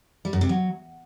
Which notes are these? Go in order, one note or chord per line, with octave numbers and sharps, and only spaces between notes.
G3
F#2
C3
F#3